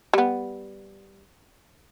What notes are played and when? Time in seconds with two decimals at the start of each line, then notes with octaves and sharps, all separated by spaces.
0.13 G3 B3